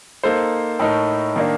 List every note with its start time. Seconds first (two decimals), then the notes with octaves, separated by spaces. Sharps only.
0.23 A#3 D#4 A4 C5
0.79 A2 A3 D#4 A#4
1.36 D#3 A#3 D4